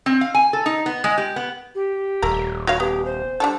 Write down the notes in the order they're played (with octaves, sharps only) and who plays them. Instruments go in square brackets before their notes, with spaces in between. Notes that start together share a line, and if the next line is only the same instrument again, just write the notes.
[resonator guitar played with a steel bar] C4
F5
G#5
A4
D#4
B3
G#3
G4
B3
[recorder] G4
[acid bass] D#1 [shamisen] A3 A#3 A#4
[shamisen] F#4 C#5 F5
[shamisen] B3 [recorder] G4
[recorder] C5
[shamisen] G3 D4 A4